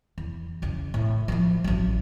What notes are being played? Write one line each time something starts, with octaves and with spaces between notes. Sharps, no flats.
E2
C#3 E3
A2
F3 E4
A1 F#3